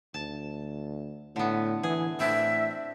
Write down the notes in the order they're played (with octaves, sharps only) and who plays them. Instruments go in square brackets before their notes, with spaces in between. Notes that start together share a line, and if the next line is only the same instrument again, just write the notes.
[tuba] D2 [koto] A5
[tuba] A2 [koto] D3 B3
[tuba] E3 [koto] G#4
[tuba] A2 [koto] C4 D4 [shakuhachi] E5